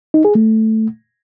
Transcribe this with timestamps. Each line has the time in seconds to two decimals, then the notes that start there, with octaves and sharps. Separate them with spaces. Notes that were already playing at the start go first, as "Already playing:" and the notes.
0.14 D#4
0.25 G#4
0.35 A3